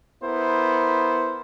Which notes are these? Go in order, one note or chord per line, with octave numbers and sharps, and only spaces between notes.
B3 E4 A#4 C5